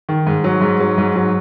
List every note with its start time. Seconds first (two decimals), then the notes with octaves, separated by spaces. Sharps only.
0.09 D#3
0.27 G#2
0.44 F#3
0.61 G#2
0.80 F#3
0.98 G#2
1.15 F#3